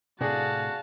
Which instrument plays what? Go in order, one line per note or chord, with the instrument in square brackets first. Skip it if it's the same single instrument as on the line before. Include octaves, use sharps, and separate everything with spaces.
[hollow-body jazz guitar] A2 C3 [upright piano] D4 G#4 [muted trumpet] F#4 [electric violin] F5 A5